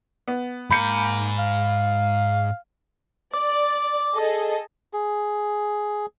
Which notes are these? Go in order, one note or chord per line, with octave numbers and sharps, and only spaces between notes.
B3
G#2 A#3 G#5 B5 G6 C#7
F5
D5 D6
G#4 A4 D#5
G#4